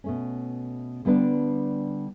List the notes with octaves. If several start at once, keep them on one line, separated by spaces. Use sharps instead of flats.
B2 A3 C#4
D3 G3 B3 D4